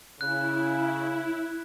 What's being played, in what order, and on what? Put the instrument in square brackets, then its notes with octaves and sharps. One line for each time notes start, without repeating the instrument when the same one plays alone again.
[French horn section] C#3 [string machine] E4 [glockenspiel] F#6